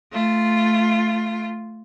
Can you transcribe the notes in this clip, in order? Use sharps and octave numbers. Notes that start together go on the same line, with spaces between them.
A3 F4